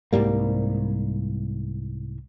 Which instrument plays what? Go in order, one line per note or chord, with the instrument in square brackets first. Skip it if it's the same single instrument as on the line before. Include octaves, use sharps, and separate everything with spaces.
[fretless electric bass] C2 G#2 G3 A#3